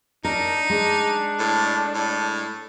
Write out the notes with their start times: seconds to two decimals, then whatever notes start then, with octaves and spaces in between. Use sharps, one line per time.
0.25 D4 D#4 A#4
0.70 G#3 D4
1.39 A2
1.95 A2